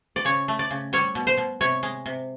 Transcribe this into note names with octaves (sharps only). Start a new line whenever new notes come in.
D5
C#3 C#5
A3
D5
C#3
G3 C#5
B2
C5
B2
C3 C#5
G#3
C3